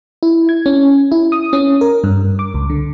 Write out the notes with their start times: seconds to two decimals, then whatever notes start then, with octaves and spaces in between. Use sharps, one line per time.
0.23 E4
0.49 G#6
0.66 C#4
1.12 E4
1.32 D#6
1.53 C#4
1.81 A#4
2.04 G2
2.39 D6
2.54 C#2
2.70 D3